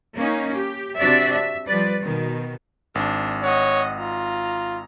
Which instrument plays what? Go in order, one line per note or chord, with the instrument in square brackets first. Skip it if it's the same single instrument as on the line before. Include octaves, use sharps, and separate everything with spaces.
[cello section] A#3 C#4 D#4
G4
C3 D4 F#4 D5 E5
E5
F3 G3 B4 D5
B2 D#3
[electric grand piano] G#1 [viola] D4
[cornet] C#5 [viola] D#5 F#5
[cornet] F4 [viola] A#5